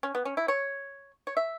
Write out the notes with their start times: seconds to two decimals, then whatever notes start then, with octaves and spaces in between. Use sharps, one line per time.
0.03 C#4
0.15 B3
0.25 C#4
0.37 E4
0.48 C#5
1.27 C#5
1.37 E5